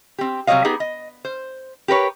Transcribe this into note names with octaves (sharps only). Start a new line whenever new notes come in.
C4 G4
C3 F#3 G3 C#5 D#5 F5
B3 D#4 G4 G#4
D#5
C5
G4 A#4 B4 C#5